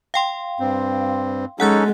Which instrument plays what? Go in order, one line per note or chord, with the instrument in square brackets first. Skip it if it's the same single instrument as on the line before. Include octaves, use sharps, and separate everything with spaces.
[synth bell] F5 G5 C6
[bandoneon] G2 C4
[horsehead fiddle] G#3 [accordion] C#4 D#4 A4 [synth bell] F#5 F#6 A6